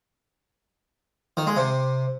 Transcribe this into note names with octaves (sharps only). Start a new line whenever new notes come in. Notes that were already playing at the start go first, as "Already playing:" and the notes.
D#3
G#3
C3